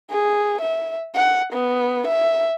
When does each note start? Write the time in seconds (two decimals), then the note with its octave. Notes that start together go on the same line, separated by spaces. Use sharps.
0.10 G#4
0.62 E5
1.16 F#5
1.53 B3
2.07 E5